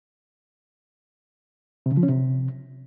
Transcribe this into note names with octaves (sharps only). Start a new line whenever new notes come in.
C3
C#3
F3
C#4
C3